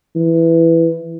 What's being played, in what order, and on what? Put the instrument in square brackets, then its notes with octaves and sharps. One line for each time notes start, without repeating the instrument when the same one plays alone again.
[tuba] E3